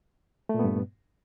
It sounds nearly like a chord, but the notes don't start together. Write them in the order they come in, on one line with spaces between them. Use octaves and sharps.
A3 A#2 B3 G2